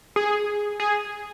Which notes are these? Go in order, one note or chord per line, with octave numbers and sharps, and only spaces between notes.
G#4
G#4